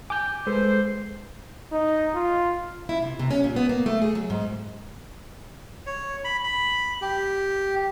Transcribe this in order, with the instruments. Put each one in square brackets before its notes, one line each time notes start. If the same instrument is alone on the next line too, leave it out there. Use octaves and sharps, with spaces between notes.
[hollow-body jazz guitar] G#5 [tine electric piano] D6 G6
[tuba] G#3 [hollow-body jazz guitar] A4 B4 [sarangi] C5
[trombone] D#4
F4
[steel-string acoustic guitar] E4
C3
C3
C#4
A#2
B3
A#3
A3
G#4
F#3
G#2
[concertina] C#5
B5
B5
G4